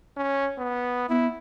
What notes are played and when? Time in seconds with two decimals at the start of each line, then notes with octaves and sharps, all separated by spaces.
0.17 C#4
0.59 B3
1.09 B3 E4